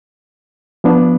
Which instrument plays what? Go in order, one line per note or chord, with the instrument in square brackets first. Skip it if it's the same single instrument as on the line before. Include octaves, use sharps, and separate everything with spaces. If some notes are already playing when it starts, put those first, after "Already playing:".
[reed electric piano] F3 B3 D4